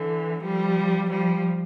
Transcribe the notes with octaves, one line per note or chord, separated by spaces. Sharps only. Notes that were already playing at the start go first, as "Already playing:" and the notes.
Already playing: D3 E3
F3 G3
F3 G3